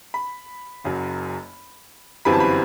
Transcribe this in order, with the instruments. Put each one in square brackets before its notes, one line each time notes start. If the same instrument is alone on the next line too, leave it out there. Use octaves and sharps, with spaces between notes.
[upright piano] B5
F#1 F#2 F#3
G1 F#2 E3 G3 C4 B5
A5
B5